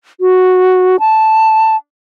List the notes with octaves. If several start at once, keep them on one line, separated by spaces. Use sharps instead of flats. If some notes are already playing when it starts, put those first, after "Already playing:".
F#4
A5